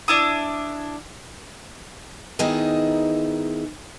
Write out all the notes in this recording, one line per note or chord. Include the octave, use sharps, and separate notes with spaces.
D4 E4 D#6
D#3 B3 D#4 E4 G#4